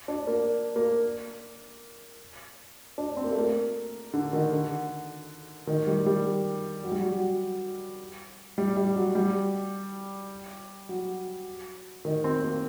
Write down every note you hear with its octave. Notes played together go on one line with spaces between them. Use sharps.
D4
A#3
A#3
D4
C4
A#3
A3
A#3
D3
D#3
D3
D#3
G3
G3
F#3
G3
F#3
F#3
G3
G3
F#3
G3
F#3
D#3
C4
A#3